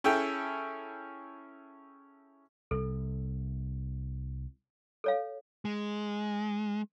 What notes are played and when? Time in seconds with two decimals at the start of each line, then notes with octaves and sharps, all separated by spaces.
0.04 C#4 E4 G#4 A4 G5
2.71 C2 A4
5.04 A4 C#5 F5
5.65 G#3